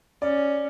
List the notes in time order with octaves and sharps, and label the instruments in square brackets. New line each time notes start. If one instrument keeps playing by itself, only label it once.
[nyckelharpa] C#4 [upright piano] D5